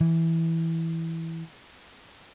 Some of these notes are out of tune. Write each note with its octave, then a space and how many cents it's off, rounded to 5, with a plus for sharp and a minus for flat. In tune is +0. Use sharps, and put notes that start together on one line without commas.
E3 -5